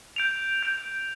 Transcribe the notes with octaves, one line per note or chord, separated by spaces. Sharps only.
G6 D7 F7
G6 D7 F7